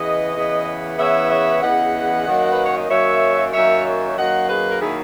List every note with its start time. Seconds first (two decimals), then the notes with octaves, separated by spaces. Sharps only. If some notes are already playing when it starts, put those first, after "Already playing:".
Already playing: E2 C#3 E3 B3 B4 D#5
0.35 E2 C#3 E3 B3
0.98 E2 C#3 E3 B3 C#5 E5
1.30 C#5 E5
1.62 E2 C#3 E3 B3 D#5 F#5
2.26 F#2 D#3 F#3 A#3
2.52 B4
2.64 C#5
2.77 D#5
2.89 F#2 D#3 F#3 A#3 C#5 E5
3.53 F#2 D#3 F#3 A#3 C#5 E5
3.85 C#5 E5
4.17 F#2 D#3 F#3 A#3 D#5 F#5
4.49 G#4 B4
4.70 A#4
4.81 D#3 F#3 A#3 E4 G#4